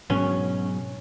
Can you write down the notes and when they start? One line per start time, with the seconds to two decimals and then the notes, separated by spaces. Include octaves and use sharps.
0.10 G#2 B2 F#3 C#4